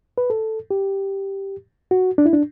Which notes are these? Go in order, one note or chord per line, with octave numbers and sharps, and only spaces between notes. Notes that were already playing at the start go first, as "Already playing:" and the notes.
B4
A4
G4
F#4
D4
E4
D4